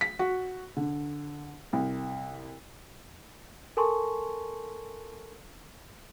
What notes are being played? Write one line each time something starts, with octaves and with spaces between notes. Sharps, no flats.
B6
F#4
D3
C2
A4 A#4 G#5 A5 C6 C#6